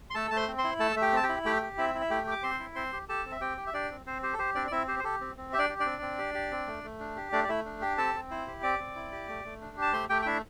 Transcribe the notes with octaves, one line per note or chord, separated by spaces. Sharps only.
C6
A3 A4 A5
A3 A5
C5 C6
C4
C5 C6
E4
A3 A4 A5
A3 E5
G4 G5
C4 A5
G4 G5
E4
A3 G4 G5
G4
C4 E4 E5
E4
E5
A3 G4 G5
G4 D6
C4 C5 C6
E4
C4 C5 C6
G4
G4 A4 A5
C4
E5
C4 G4 G5
G4
E5
D4 G4 D5
C4
C4 C5
G4 C5
A4
G4 C5
C4 D4 D5
D5
C4 E4 E5
G4 C5
C5
G4 A4
C4
C4
G4 E5
D4 D5
G4
D4 D5
C4
C4
G4
G4
C4
A3
A3
D4
G4
A3 D4 D5
D5
A3 E4 E5
D4
G4 G5
C4 A4 A5
C4
E4 C5
G4
C4 D5 D6
C4
E4
G4
A3
A3
D4
G4 A5
A3 C5 C6
A3 G4 G5
G5
D4 E4 E5